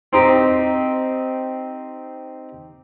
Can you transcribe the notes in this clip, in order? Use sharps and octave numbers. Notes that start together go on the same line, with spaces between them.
C4 D#4 G4